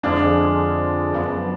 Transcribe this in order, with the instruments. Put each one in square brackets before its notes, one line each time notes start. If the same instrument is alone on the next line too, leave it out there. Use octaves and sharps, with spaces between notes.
[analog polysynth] F2 D3 F3 G#3 [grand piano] D4
[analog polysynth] F#2 F3 B3